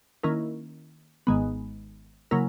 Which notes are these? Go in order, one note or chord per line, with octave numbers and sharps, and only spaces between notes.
D#3 A#3 C#4 E4 A#4
G#1 G#2 D#3 G#3 B3
C#3 F#3 A#3 E4 A#4